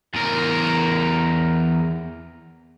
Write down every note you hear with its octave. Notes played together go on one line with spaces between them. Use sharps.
E2 A#4